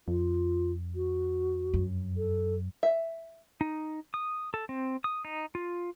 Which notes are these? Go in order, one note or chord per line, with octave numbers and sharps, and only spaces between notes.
F2 F4
F#4
F#2
A4
E5
D#4
D#6
A4
C4
D#6
D#4
F4